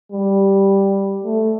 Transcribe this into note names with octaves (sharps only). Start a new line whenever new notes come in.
G3
A3